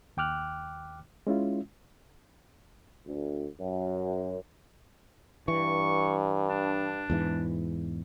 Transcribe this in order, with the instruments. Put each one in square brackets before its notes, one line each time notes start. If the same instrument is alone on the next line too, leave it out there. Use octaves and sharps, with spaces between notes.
[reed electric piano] D#2 G5 D6 F6 F#6
G#3 C#4 E4 F4
[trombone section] D2
F#2
[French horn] G2 [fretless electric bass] E3 [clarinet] C#6
[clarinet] D4
[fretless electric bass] E2 G#2 E3